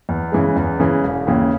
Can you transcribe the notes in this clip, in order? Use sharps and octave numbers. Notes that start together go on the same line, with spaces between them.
E2
C#3 E3 G#3
E2
C#3 E3 G#3
E1
D#2 C#3 E3